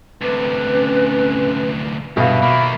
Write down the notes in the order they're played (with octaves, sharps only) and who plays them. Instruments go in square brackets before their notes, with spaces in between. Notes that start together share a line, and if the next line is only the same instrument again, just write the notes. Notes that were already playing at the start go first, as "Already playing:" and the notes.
[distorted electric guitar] D2 C3 [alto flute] B4
[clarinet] C#4
[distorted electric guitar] G2 [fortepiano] B2 F5 [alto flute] E5
[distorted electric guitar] D#3 A#3 [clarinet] B5